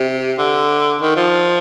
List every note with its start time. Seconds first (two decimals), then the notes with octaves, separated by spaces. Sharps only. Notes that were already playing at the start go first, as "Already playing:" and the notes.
Already playing: C3
0.38 D3
1.01 D#3
1.16 F3